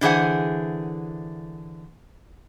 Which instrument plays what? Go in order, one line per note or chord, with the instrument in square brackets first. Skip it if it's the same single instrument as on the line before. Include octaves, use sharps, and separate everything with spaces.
[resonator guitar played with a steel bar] D3 E3 G#4 C5 F#5